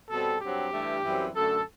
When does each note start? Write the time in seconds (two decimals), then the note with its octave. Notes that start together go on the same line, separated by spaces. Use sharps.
0.09 B2 G3 C4 A4
0.41 G2 F#3 C4 G4
0.72 G2 E3 A3
1.03 F#2 E3 G3 C4
1.34 F#2 D3 A3 A4